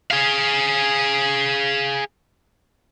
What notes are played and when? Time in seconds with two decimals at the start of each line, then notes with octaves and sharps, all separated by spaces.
0.11 G#4 F5